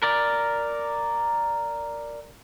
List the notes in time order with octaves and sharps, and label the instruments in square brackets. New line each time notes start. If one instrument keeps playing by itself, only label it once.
[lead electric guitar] A#4 D5